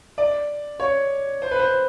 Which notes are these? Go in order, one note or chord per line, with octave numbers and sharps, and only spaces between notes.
D5
C#5
C5
B4
C5